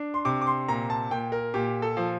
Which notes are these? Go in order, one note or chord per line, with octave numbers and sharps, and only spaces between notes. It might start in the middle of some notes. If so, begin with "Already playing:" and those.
Already playing: D4
C6
C3 D6
D6
C6
A#2 A#5
A5
A#2 G5
A#4
A#2 G4
A4
F3